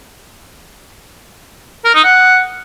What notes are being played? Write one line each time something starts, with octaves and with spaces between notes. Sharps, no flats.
A#4
D#4
F#5